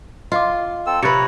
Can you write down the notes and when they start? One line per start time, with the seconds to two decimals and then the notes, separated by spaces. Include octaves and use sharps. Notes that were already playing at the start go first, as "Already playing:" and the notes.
0.32 F4 D#5 F5 D6
0.87 C4 A4 E6
1.03 C3 B4 C#5 A#5 F#6 A6 C#7